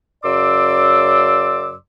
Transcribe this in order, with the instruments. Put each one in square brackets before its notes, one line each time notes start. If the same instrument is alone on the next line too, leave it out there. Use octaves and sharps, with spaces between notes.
[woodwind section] F#2 C#3 D5 C6 D6 E6